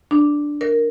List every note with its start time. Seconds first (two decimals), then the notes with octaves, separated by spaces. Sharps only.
0.11 D4
0.61 A#4